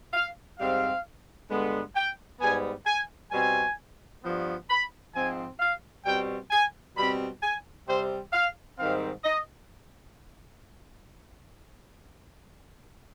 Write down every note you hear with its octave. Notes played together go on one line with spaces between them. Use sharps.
F5
G#2 G3 C4 F5
G2 D3 G#3 B3
G5
G#2 G3 B3 G#5
G#5
B2 G3 C4 G#5
G2 F3 B3
B5
G#2 F3 C4 G#5
F5
B2 G3 C4 G5
G#5
B2 G3 C4 B5
G#5
C3 G3 C4 C5
F5
G#2 D#3 G3 C4 F5
D#5